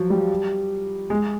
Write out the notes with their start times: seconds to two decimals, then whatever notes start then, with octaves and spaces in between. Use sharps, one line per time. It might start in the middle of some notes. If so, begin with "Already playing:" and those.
Already playing: F3 F#3
0.10 G3
1.10 G#3